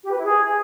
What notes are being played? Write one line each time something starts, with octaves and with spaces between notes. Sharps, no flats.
G4
B4
E4
G#4